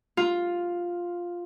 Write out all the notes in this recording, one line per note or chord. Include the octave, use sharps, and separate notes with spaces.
F4